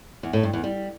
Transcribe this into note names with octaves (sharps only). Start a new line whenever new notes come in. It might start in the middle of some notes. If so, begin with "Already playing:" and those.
E2
A2
G2
E2
G3